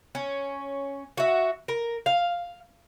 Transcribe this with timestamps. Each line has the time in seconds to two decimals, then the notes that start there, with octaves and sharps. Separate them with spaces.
0.15 C#4
1.17 F#4 E5
1.68 A#4
2.06 F5